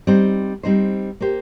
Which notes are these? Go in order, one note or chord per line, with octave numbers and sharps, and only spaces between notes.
G3 C4 D#4 C5
G3 C4 D#4 C5
A#3 G4 C5